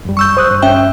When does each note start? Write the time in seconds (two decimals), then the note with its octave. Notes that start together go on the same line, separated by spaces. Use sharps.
0.05 F#2 G3
0.17 C#6 E6 G6
0.37 C5 D#6 F#6
0.51 G2
0.62 C#4 E5 G5